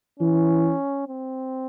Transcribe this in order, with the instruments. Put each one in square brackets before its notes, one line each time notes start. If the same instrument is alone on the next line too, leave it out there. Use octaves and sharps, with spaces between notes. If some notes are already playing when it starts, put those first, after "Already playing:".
[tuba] E3 [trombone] C#4
[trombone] C4